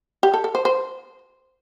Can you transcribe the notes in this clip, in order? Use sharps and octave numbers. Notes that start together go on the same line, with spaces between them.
G4
A4
A4
C5
C5